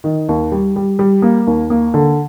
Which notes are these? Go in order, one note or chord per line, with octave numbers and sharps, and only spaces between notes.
D#3
D#2
G3
G3
G3
A#3
D#2
A#3
D3